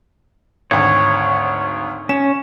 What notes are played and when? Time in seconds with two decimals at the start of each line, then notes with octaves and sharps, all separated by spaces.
0.71 G#1 D2 C#5
2.09 C#4 E7